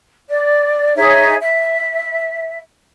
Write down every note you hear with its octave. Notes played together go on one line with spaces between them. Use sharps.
D5
D#4 G#4 C#5 E5
E5